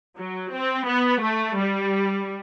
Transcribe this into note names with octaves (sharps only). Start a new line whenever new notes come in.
F#3
C4
B3
A3
G3